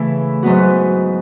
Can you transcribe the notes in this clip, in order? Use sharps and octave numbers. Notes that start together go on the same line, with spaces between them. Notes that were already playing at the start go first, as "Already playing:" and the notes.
Already playing: C#3 E3 A3 E4
G#2 F#3 B3 F#4